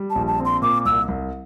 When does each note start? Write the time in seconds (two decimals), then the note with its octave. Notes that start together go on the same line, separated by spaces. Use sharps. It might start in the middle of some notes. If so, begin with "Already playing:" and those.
Already playing: G3
0.10 A5
0.15 A#1
0.28 A5
0.40 C4
0.45 C6
0.62 A#2 D6
0.85 C2 E6
1.08 C2